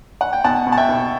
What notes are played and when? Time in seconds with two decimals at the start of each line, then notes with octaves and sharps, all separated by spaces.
0.21 F#5
0.33 G5
0.44 B2 F#5 A5
0.67 B2
0.72 A5
0.77 E5 G5
0.89 B2